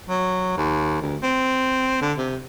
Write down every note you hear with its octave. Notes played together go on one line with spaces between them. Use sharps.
F#3
D#2
D2
C4
D3
C3